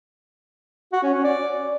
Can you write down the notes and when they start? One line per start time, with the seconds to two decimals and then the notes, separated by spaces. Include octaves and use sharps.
0.93 F#4
1.03 C#4
1.14 C#4
1.24 D5